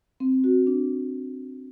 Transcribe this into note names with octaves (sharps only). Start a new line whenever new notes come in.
C4
F#4
D4